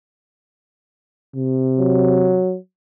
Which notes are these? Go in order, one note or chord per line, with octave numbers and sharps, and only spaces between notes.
C3
F#3